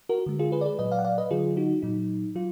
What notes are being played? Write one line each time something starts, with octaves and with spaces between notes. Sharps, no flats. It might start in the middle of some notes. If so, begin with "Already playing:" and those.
F#4 A#4
D3 G#3
F4 G#4
G#4 B4
D5
G#4 B4
A#2 F#3 B4 D#5
D5 F5
F#5
D5 F5
B4 D#5
D3 F#3 F4 G#4
D#4 F#4
A#2 F#3 D#4
F#3 F4